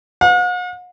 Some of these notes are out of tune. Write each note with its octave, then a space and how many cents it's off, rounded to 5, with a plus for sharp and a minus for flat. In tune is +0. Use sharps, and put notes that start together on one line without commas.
F#5 -45